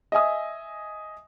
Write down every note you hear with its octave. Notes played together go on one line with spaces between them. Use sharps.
D#5 E5 G#5 D#6